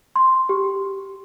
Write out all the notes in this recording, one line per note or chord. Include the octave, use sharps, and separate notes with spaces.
C6
G4